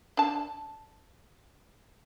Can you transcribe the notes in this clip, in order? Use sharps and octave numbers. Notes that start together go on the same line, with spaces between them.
D4 A5